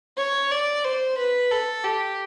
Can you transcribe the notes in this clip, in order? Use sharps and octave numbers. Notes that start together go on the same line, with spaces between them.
C#5
D5
C5
B4
A4
G4